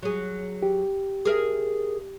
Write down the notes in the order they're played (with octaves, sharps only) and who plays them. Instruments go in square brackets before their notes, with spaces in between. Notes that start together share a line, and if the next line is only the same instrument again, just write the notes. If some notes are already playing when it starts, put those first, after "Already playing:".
[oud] F#3 G#4
[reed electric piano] G4
[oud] G#4 A#4 E5